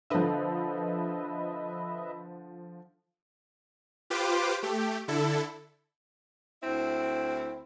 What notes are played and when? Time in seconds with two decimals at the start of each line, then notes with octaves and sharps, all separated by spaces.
0.10 D3 F3 B4 D#5 E5
4.10 F4 G4 B4 C5 D6
4.63 A3 G4
5.08 D3 E4 A4
6.63 D2 C4 E4